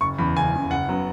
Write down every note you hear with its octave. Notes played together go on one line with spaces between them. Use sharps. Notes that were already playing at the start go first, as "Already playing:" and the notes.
F#1 C#6
E2 C#3 B5
F#1 G#5
E2 C#3
F#1 F#5
C#3 F#3 B3